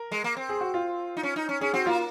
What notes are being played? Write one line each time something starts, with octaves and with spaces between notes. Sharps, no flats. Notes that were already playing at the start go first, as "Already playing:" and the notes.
Already playing: A#4
G#3
A#3
C4
G#4
F#4
F4
D#4
C#4
D#4
C#4
C#4 G#4
C4 F#4
A#3 F4